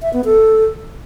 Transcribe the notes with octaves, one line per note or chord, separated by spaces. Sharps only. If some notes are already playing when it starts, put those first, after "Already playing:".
E5
B3
A4